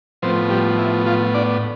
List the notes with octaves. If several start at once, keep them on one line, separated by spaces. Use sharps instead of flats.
A2 F3 B3 C4 C5
G3 G4
E4
F3 F4
D4 D5